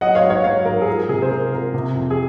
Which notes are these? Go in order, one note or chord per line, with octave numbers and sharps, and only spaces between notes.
F#3 D#5 F#5
C#5 F5
G#2
C#5 F5
F#3 C#5 F5
G#2 A#4
G#4
F3 A#4
C3 G#4
C5
C3 A#4
F3 A#4
C3
F2
G#4